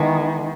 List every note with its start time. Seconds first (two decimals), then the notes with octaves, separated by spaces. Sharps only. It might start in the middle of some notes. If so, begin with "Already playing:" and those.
Already playing: D#3 E3 G#3 B3